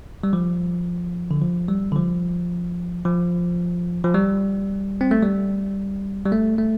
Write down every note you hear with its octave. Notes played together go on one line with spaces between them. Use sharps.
G3
F3
D3
F3
G3
D3
F3
F3
F3
G3
C4
A3
G3
G3
A3
A3